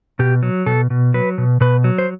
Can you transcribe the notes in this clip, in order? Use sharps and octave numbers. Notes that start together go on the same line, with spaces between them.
B2 G4
F#3
B2 A4
B2
F#3 B4
B2
B2 B4
F#3
C5